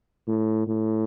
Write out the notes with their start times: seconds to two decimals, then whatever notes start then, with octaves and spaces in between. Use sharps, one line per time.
0.28 A2
0.67 A2